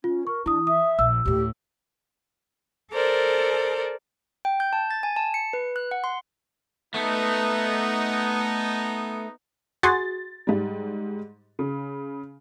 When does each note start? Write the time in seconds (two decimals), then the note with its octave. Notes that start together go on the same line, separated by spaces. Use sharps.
0.04 C#4 F4
0.27 A#4 C#6
0.46 E3 D4 E4 D#6
0.67 E5 D#6
0.99 A#1 E6
1.25 D2 A2 G4
2.92 A4 A#4 C5 D5
4.45 G5
4.60 G6
4.73 A5
4.91 A6
5.03 G#5
5.16 A5
5.34 C#7
5.53 B4
5.76 F#6
5.91 F#5
6.04 C6
6.94 A3 B3 D#4
9.83 F#4 G#4 C6 A6
10.47 G#2 G3
11.59 C#3